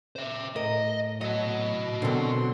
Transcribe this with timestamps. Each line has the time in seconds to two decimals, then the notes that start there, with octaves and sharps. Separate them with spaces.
0.16 C5 E5
0.56 A2 A#4 D#5
1.21 F#3 F#4 D#5
2.02 B2 D3 F#3 C4 A#4 C6